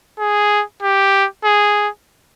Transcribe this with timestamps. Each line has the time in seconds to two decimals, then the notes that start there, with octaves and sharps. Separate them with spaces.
0.19 G#4
0.82 G4
1.44 G#4